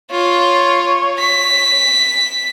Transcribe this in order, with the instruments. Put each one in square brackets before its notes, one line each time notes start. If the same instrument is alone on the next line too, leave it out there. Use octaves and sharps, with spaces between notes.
[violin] F4 [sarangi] C#5
[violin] B6